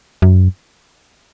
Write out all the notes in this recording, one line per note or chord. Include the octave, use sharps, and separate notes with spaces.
F#2